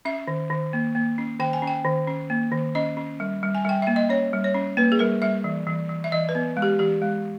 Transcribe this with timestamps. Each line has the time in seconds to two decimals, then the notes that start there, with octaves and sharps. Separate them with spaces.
0.05 C#4 E5
0.28 D#3
0.50 D#3
0.73 A#3
0.95 A#3
1.18 C#4
1.40 D#3 G5
1.53 G#5
1.62 C#4
1.67 G5
1.85 D#3
2.08 C#4
2.30 A#3
2.52 D#3
2.75 C#4 D#5
2.97 C#4
3.20 G3
3.43 G3
3.55 G#5
3.65 G3 G5
3.82 A#3 E5
3.96 D#5
4.09 C#4 C#5
4.33 G3
4.44 C#5
4.54 C#4
4.77 A#3 B4
4.92 G#4
4.99 G3 A#4
5.22 G3 E5
5.44 E3
5.67 E3
5.89 E3
6.04 E5
6.12 E3 D#5
6.29 B4
6.35 B3
6.57 G#3
6.62 G4
6.79 E3 G4
7.02 G#3